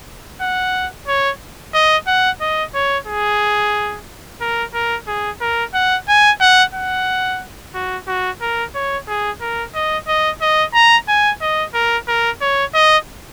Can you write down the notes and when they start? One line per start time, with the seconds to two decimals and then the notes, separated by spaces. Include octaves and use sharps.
0.41 F#5
1.08 C#5
1.74 D#5
2.07 F#5
2.41 D#5
2.75 C#5
3.07 G#4
4.41 A#4
4.74 A#4
5.07 G#4
5.41 A#4
5.74 F#5
6.08 G#5
6.41 F#5
6.74 F#5
7.75 F#4
8.08 F#4
8.41 A#4
8.75 C#5
9.08 G#4
9.41 A#4
9.75 D#5
10.08 D#5
10.41 D#5
10.74 A#5
11.08 G#5
11.41 D#5
11.74 A#4
12.08 A#4
12.41 C#5
12.75 D#5